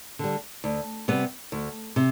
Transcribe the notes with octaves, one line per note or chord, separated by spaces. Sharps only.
D3 G3
D2
C3 G3 B3
D2
C3